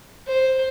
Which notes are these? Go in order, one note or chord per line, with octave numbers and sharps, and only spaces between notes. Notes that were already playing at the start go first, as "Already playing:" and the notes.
C5